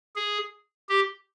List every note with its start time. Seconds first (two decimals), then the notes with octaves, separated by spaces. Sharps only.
0.16 G#4
0.89 G4